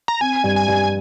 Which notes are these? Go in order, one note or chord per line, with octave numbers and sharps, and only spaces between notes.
A#5
C4 G#5
G2
G#5
G2